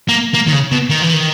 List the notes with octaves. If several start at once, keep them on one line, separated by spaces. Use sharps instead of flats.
A#3
A#3
D#3
C#3
B2
D#3
E3
D#3